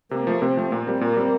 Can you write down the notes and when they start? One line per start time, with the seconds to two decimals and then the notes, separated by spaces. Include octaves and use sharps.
0.11 C3 A#3
0.27 F3 A3
0.42 C3 C4
0.57 F3 A3
0.71 A#2 A#3
0.87 G3 C4
1.01 A#2 A#3
1.16 G3 C4